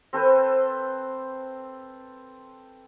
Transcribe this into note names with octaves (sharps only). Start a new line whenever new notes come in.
C4 A4 B4 C5